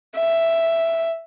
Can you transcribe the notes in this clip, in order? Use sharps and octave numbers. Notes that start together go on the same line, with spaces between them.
E5